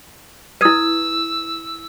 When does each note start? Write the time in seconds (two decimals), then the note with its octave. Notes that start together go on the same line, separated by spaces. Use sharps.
0.61 E4 B4 D#6 E6 G#6 D#7